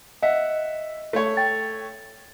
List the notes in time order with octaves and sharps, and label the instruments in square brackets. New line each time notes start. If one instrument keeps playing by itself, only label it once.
[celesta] D#5 [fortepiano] E5 F#5
[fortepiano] A3 C#5
[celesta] G5 A6